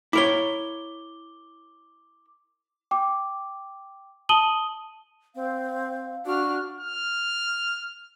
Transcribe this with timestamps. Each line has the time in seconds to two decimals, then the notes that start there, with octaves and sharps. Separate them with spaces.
0.13 E4 A#4 C#5 D6 G7
2.91 G5 D6
4.29 A5 D#6 D#7 F#7 G7
5.35 C4 F5
6.26 D4 F#4 F6
6.80 F6